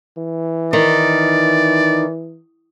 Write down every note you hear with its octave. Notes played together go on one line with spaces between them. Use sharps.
E3
D#3 D5